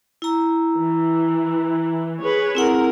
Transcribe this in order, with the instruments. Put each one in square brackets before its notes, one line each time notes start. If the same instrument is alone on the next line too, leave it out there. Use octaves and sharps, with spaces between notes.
[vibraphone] E4 A#5 E6
[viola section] E3
G#4 B4 C#5
[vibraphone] C4 E4 F#5 [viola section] G#4 A#4